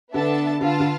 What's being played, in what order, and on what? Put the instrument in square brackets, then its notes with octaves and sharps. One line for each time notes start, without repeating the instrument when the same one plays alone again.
[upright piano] D3 [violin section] B3 D4 A4 E5 A5
[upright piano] D3 [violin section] F4 B4 F5 A5
[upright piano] D3